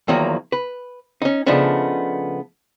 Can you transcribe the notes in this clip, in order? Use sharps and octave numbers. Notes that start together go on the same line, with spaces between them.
E2 D#3 F3 F#3 A#3
B4
C#4 D#4
C#3 F3 A3 B3 D4 D#4